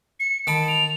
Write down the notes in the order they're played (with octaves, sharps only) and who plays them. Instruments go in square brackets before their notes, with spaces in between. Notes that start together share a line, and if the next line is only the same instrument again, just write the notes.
[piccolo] C#7
[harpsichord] D#3 A5 B5 [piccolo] D7
[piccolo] F7